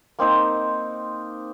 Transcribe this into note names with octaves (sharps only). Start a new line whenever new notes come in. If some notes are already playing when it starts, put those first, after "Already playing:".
A#3 C4 D#4 C5